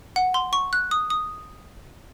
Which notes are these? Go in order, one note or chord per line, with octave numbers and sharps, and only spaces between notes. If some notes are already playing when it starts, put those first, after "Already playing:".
F#5
C6
C#6
F#6
D#6
D#6